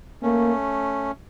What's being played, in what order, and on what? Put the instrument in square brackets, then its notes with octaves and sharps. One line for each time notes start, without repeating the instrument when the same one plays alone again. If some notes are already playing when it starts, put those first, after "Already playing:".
[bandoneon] A3 C#4 [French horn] A#3